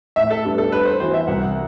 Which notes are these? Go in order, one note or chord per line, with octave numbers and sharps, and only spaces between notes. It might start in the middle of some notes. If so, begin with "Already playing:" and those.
A2 E5
A4
G3 B3 D4 G4
A4
G2 B4
C5
E3 B3 F#4 C5
E5
C2 F#5